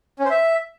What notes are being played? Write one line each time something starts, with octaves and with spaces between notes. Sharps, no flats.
C#4
C5
E5